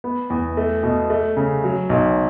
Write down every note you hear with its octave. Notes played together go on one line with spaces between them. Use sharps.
B3
E2
A3
B2
A3
C#3
F#3
B1